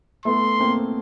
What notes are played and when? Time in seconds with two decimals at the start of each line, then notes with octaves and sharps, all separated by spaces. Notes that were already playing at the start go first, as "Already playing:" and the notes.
0.25 A3 B3 C6
0.60 A#3 C4